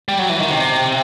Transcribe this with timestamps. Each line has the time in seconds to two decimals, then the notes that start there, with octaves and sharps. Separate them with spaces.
0.08 G3
0.19 F#3
0.29 E3
0.40 D#3
0.50 C3